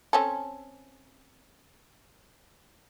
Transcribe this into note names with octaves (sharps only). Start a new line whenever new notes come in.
C4 C#4 A4